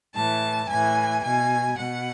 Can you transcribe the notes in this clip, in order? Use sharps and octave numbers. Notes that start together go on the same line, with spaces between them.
A2 E3 A5
A2 E3 G#5
B2 G#5
B2 F#5